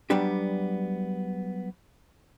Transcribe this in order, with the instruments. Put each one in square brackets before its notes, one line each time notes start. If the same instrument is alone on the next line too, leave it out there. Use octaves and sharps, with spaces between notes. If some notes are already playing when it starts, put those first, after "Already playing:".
[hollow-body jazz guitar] F#3 G3 B3 D4 G4